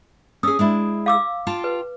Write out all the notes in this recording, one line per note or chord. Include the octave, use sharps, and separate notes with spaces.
C#4 G#4 D#6 E6
G#3 D4 E4
F5 D6 E6
F4 G5 A5
B4